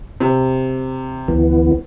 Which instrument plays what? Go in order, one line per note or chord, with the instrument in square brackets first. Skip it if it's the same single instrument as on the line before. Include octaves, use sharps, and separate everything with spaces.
[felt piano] C3
[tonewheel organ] D2 E3 B3